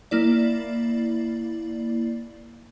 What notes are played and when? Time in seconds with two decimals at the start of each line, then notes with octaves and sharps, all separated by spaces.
0.11 A#3 E4 D5